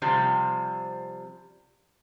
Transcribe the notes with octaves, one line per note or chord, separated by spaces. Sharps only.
C3 F3 G3 C4